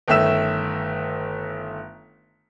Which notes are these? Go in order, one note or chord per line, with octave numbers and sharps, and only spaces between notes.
G1 D#3 A3 E5 E6 E7